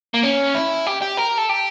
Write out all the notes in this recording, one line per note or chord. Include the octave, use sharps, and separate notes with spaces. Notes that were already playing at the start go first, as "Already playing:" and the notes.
A#3
C#4
E4
G4
G4
A#4
A4
G4